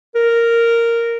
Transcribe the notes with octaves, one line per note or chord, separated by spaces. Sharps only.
A#4